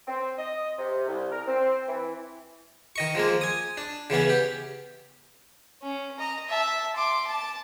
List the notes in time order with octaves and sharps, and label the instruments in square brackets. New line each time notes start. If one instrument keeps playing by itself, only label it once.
[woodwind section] C4
D#5
C3
C2
A#4
C4
E3
[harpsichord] D#3 D#5 C#6
F3 G#3 A#3
G#5 D#6
D4
C#3 E3 B3 C#4
G4
[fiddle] C#4
D#5 A#5
E5 A5
C6 D6
A5